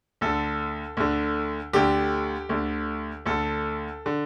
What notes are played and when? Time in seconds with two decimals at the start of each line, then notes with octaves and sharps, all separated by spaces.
0.21 D2 D3 A4
0.97 D2 D3
1.73 D2 D3 G4
2.49 D2 D3
3.26 D2 D3 A4
4.06 D3